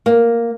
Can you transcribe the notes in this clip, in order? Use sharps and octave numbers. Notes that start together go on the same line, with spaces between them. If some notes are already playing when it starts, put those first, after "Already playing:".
A#3